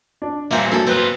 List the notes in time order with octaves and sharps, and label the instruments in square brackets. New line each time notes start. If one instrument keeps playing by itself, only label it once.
[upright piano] D4
[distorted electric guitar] G2 A#2 [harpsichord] A#3 C4 [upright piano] E5 F5 G#5
[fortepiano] F#3 A#3 [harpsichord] E4 A4
[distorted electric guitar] B3 F4 [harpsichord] C4 [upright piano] B4 F#6